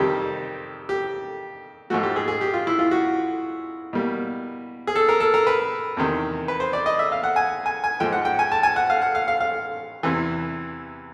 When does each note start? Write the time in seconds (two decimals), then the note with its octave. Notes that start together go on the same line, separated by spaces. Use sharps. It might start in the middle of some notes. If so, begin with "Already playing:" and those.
Already playing: F2 C3 D#3 G3 G4
0.89 G4
1.90 G#2 F3 A3 F#4
2.03 G4
2.16 G#4
2.28 G#4
2.41 G4
2.54 F4
2.67 E4
2.79 F4
2.91 F#4
3.93 B2 G3 A#3
4.87 G#4
4.96 A4
5.09 A#4
5.20 A4
5.34 A#4
5.47 B4
5.97 E2 C3 D#3
6.48 B4
6.60 C5
6.73 D5
6.86 D#5
6.99 E5
7.12 F5
7.24 F#5
7.36 G#5
7.66 G#5
7.84 G#5
8.00 G#2 F3 G#3 G5
8.12 F#5
8.25 G5
8.39 G#5
8.52 A5
8.63 G#5
8.76 F#5
8.90 F5
9.02 F#5
9.15 F5
9.28 F5
9.40 F5
10.03 E2 C3 E3